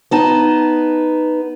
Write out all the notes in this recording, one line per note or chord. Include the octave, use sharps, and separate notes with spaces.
B3 D#4 A5